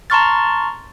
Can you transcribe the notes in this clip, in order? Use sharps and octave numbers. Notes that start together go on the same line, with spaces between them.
A5 A#5 C6 C#6 F6 A6